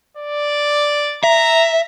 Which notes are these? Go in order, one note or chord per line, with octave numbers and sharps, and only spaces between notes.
D5
E5 A#5